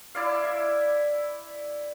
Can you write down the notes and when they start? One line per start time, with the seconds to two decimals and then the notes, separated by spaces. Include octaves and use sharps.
0.15 E4 D5 F5
0.44 E5